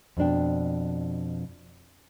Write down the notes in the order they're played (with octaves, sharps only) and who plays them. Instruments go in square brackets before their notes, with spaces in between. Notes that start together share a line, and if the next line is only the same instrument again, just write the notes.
[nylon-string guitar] F2 B2 D4 G5